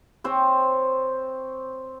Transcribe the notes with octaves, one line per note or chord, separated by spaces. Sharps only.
C4 C5 C#5